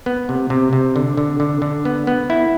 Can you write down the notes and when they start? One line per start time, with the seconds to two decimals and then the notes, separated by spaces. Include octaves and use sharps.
0.06 B3
0.29 C3
0.50 C3
0.73 C3
0.96 D3
1.17 D3
1.40 D3
1.62 D3
1.85 B3
2.07 B3
2.30 E4